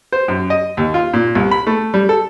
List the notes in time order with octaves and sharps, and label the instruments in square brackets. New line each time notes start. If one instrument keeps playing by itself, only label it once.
[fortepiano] C5
F#2
D#5
D#2
F4
A#2
C2
B5
A3
G3
A4